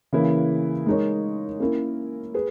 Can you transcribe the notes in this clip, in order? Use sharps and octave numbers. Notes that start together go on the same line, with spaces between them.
C#3 E3 A#3 E4
G#3 D#4 A#4 C#5
A#3 C#4 E4 A#4
G#4 B4